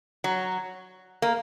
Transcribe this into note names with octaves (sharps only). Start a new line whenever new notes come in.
F#3
A#3